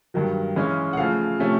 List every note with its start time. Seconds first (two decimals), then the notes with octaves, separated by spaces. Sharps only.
0.14 G2 D#3 F#3
0.56 C#3 E3 G#3 C#4
0.93 F#5
0.97 C#3 F3 A3 F5
1.40 C3 F3 A3 C#4